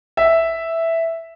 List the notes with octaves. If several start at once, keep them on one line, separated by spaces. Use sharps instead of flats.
E5